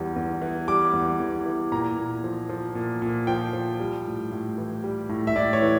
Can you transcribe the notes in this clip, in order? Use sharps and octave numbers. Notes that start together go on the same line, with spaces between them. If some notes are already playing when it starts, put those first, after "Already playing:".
Already playing: E2 G3
E2
E3
G3 D6
E2
E2
E3
A#2 A#5
A#2
F3
F3
A#2
A#2
F3 G5
F3
G3
A2
A2
E3
G3
A2
E5
A2 D5
C#5
E3